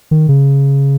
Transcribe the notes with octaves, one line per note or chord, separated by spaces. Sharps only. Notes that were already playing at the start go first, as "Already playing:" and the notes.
D#3
C#3